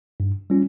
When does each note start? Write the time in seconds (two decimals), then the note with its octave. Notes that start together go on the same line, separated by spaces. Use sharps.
0.20 G2
0.50 G3 C#4 F4